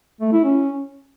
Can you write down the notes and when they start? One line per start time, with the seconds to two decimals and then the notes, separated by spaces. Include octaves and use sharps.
0.21 A3
0.33 E4
0.44 C#4